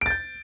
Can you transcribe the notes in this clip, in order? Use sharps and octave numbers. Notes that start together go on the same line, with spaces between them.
G6 A6 D7